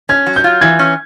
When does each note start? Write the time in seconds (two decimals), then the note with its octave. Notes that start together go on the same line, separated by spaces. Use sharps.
0.09 C#4 G#6
0.26 F#3
0.36 G6
0.44 F4
0.61 E3 G#6
0.79 C#4